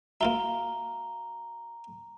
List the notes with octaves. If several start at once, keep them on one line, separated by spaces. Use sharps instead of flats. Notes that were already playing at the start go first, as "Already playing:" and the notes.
A#3 F4 F#4 E5 F5 A#5 G7